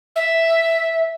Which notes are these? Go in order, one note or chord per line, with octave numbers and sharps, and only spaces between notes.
E5